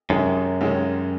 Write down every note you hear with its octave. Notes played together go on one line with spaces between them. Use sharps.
C#2 F#2 C3 D#3 G#3
C#2 C3 D#3 G#3 C#4